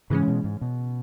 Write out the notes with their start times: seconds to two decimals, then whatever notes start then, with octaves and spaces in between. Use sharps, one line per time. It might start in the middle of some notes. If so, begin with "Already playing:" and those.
0.10 G#2 C#3 E3 G#3 C#4
0.28 B2
0.44 G#2
0.61 B2